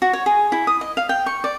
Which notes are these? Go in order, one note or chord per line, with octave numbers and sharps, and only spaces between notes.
F#4
C#5
G#4
E4
D#6
D#5
F5
G5
C#6
D5